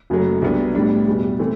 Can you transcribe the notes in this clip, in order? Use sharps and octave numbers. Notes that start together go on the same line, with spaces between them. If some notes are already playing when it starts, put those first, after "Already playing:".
F#1 F#2 F#3 A3
C2 C3 F#3 B3 D4
A1 A2 G3 B3 D4
E2 B2 G3
E3 A3 C4